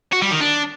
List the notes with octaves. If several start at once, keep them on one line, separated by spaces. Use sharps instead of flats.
F#4
G3
D#3
D4